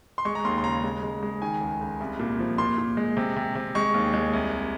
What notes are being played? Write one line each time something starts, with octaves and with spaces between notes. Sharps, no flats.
C6
G#3 C#6
A#5
D#2 C6
C6
C#3 A#5
G#3
G#3
G#3
D#3 G#5
C#2
C#2
C2
A#2
F3
A#2 C6
A#2
G#3
C3
C3
C3
G#3 C#6
D#2
G#3
C2